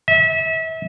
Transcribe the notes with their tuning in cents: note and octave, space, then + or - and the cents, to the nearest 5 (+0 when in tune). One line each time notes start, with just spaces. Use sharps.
E5 -30